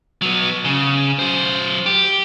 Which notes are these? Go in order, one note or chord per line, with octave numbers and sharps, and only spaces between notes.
F#3 B3
C#3
F#3 C5
G4